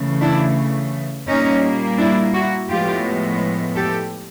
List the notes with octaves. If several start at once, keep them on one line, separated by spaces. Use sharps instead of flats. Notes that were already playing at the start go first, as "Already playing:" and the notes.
Already playing: C#3 E3 A3
D4 E4
A#2 G3 A#3 C#4 D#4
D4 E4
E4 F#4
A2 F3 G#3 B3 F4 G4
G4 A4